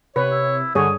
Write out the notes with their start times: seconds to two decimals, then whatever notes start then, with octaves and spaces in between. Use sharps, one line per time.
0.16 C3 B4 C#5
0.31 E4
0.75 G2 D3 G#4 C#5 D#6